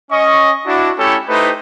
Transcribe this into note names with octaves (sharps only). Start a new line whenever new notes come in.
C#4 D#5 C#6
D4 E4 F#4
A3 C#4 E4 G4 A4 C#5
A3 D#4 E4 G4 B4 C5